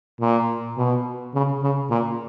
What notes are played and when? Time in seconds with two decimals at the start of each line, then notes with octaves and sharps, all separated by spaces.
0.20 A#2
0.77 B2
1.34 C#3
1.62 C#3
1.91 A#2